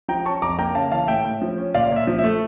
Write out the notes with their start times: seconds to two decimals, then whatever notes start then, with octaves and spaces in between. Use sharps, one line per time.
0.08 F3 G5 A#5
0.25 C#4 A5 C#6
0.42 F2 A#5 D6
0.59 A#3 G5 A#5
0.75 C#3 F5 A5
0.91 E3 F5 A5
1.08 A2 E5 G5
1.25 A2
1.42 F3
1.58 C#4
1.74 A#2 D5 F5
1.91 A#2
1.96 E5
2.07 F3
2.18 E5
2.24 A3